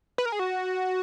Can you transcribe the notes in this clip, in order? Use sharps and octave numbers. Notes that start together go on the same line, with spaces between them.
B4
A#4
G#4
F#4